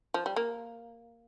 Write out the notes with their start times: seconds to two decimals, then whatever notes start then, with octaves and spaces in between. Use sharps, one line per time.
0.14 F3
0.26 G3
0.36 A#3